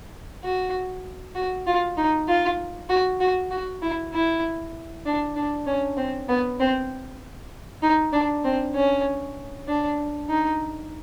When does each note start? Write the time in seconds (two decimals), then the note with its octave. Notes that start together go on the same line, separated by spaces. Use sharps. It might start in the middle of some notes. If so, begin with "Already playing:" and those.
0.44 F#4
1.35 F#4
1.67 F4
1.97 D#4
2.28 F4
2.90 F#4
3.20 F#4
3.51 F#4
3.82 E4
4.13 E4
5.06 D4
5.36 D4
5.67 C#4
5.97 C4
6.29 B3
6.60 C4
7.82 D#4
8.13 D4
8.45 C4
8.74 C#4
9.68 D4
10.29 D#4